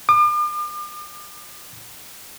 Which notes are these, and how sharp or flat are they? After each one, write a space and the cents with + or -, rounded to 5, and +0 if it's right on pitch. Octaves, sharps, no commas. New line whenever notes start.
D6 +45